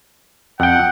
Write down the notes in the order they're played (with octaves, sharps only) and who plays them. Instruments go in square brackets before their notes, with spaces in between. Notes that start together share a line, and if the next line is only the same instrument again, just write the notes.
[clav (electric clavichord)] F2 G5 [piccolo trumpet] F#5